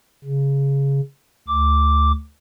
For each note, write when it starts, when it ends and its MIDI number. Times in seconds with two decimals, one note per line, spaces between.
0.24 1.00 49
1.48 2.12 38
1.48 2.12 86